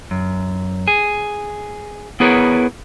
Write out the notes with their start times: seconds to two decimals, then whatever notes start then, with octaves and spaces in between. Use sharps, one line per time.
0.11 F#2
0.88 G#4
2.20 B3 E4 G#4 A#4 B4 C#5